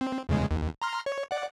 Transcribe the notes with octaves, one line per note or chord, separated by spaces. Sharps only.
C4
E2 C#3 G#3
D#2
A#5 C6 F6
C#5
D5 F#5